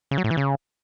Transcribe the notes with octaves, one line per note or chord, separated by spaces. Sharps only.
C#3
F#3
A2
E3
C#3